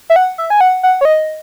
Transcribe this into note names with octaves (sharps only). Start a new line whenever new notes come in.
E5
F#5
E5
G#5
F#5
F#5
C#5
D#5